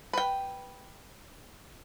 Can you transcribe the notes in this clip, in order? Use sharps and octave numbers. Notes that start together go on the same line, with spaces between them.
B4 G5